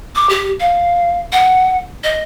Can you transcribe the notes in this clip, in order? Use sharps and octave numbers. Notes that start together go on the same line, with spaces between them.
D6
G4
F5
F#5
D#5